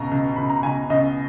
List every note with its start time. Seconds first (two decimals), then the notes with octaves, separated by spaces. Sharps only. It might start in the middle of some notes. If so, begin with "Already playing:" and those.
Already playing: C#2 B2 A#5
0.11 C#2
0.36 C#2 B5
0.50 A#5
0.63 C#2 G#5
0.90 C#2 D#5